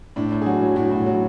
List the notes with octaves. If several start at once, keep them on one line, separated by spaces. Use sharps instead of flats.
A2 D4
A2
G#4
F#3 F#4
F#3
A2 F#4
A2
F#3